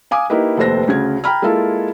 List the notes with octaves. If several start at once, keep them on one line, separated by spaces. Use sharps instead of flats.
F5 G#5 D6 D#6
A#3 D#4 E4 G4 B4
F1 D#2 A4 B4 C5 A#6
D2 C#3 G#6
G5 A#5 B5 F6
G#3 A#3 E4 F4 A4